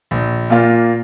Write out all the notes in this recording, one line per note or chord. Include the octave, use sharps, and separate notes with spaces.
A#1
A#2 A#3 F4